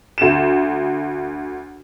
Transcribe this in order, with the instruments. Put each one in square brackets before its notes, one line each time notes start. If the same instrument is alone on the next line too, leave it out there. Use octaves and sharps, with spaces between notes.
[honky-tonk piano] D2 E7